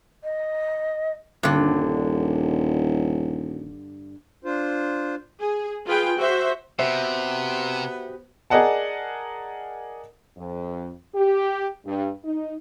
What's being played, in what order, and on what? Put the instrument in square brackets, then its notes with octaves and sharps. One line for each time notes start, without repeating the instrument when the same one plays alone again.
[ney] D#5
[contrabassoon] D#1 [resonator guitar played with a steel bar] G2 D3
[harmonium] D4 F4 C5
[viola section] G#4
F4 G#4 B4 G5
F#4 C5 E5
[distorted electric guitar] C3 [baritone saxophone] B3 [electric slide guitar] F#4 G4 C5 [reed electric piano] E5
[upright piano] G#4 A#4 D5 D#5 F#5 A5
[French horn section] F2
G4
G2
D#4